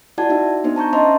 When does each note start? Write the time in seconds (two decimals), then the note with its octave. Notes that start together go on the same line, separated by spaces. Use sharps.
0.18 E4 F#4 D5 F#5 A5 G#6
0.30 D#4 F#4 E5
0.64 B3 D4 D#4 C5
0.76 A5 A#5 C#6 G6
0.93 C#4 C5 D#5 E5 A5 C6